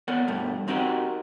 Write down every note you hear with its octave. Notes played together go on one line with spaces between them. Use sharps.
B3 A#4 C#5 D5 F#5
G2 B2 A3
C4 D#4 F#4 G4 A#4